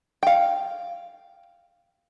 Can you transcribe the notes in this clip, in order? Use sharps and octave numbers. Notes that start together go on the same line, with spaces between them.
F5 G5